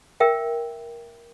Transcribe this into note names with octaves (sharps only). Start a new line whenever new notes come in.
A#4 E5 G5